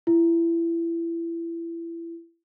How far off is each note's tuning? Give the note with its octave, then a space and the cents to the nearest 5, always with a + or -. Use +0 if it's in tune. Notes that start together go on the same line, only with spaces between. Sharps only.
E4 +25